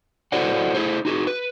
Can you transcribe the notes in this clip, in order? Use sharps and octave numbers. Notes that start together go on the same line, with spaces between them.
E4 F#4 A4 C5 D5 F#5
E4 G#4 C5
D#4 F#4 G#4
B4